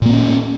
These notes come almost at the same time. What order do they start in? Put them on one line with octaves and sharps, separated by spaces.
A#2 A#3 B3 C#4